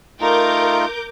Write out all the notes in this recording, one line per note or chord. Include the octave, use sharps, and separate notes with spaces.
A3 D#4 F4 A#4 D6 G6